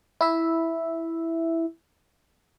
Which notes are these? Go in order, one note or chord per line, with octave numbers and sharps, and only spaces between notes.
E4 E5